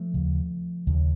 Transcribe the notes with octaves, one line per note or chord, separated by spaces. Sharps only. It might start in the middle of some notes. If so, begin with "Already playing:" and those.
Already playing: F3 A3
D#2 C#3
D#2 C#3